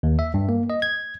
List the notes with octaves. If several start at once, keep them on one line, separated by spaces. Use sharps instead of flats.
D#2
E5
G2
A#3
D#5
G#6